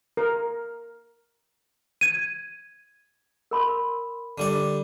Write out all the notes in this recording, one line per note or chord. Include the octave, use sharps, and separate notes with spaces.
A#4
G#6 D#7
A#4 B5 C6
D3 G3 D5